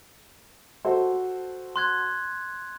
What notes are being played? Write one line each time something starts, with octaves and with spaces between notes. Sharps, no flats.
F#4 A4 C5
C6 F#6 G#6